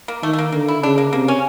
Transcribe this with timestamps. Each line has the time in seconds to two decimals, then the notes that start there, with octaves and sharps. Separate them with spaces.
0.08 A#3
0.23 D#3 A3
0.33 A3
0.38 A#3
0.52 D3 A#3
0.68 E4
0.83 C#3 D4
0.98 A#3
1.13 C3 A#3
1.28 C#4